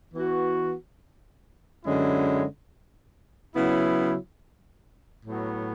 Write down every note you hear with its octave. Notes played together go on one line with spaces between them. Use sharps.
E3 B3 F#4
F#2 D3 G#3 C#4 E4
C#3 F#3 B3 E4
A2 F#3 B3